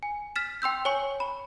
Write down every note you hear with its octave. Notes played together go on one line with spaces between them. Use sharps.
G#5
F6 A6 B6 E7
G5 C6 E6 G6
C#5 G#5 C#6
B5